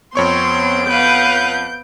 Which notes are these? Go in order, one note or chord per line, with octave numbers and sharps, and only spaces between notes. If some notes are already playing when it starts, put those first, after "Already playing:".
F2 B3 C4 C#5 C6 C#6 D7
B4 F5 F#5 G6